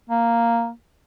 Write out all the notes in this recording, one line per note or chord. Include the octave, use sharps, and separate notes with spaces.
A#3